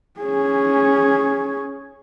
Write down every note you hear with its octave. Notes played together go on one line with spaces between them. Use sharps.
C#4 G#4